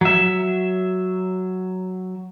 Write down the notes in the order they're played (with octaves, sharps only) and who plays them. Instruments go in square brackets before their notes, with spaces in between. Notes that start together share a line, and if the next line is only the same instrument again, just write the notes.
[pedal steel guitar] F#3 E5